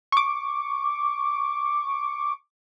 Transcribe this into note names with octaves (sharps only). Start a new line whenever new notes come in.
C#6 D6